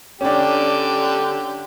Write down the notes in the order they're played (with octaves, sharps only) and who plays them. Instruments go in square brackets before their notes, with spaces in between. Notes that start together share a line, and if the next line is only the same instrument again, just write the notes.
[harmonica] D3 G4 [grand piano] C#4 D4